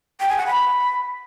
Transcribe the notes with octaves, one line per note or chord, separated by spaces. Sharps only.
G5
G#5
F#5
B5